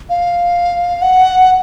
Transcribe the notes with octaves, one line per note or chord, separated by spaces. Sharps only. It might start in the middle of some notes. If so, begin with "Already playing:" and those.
F5
F#5